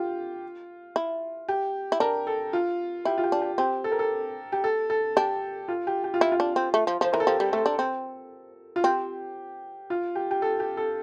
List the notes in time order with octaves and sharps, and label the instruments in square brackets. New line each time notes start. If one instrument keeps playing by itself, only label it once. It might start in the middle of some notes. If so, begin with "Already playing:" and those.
Already playing: [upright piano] F4 G4
[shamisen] E4
[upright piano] G4
[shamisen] E4
[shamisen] D4 [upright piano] A#4
[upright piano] A4
F4
[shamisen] E4 [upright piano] G4
[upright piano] F4
G4
[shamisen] D4
[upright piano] G4
[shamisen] C4 [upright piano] G4
[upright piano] A4
A#4
A4
G4
A4
A4
[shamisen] D4 [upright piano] G4
[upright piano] F4
G4
G4
F4
[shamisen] E4
[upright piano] F4
[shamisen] D4
C4
A3
F3
[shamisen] F3 [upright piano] C5
[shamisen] E3 [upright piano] A#4
[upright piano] A4
[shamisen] F3 [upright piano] G4
[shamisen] G3
[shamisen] A3 [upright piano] A4
[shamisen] D4
C4
[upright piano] F4
[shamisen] C4 [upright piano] G4
[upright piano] F4
G4
G4
A4
G4
A4